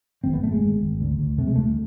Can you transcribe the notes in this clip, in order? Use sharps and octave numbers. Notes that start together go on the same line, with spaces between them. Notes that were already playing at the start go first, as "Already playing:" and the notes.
G#1 C4
B3
G#1 A3
G#3
G#1
G#1
D2
D2
C3 A3
G#3
D2 A3